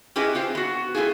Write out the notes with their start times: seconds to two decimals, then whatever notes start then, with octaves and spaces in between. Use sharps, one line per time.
0.16 C#4 E4 G4 G#4 B4 D#5
0.35 C4 F4 C5
0.55 B3 F#4
0.95 A3 C4 E4 F4 G#4